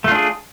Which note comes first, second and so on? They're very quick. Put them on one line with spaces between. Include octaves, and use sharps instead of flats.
A3 F4 D4 G#4